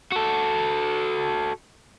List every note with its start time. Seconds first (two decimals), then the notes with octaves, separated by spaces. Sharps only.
0.12 F#4 A4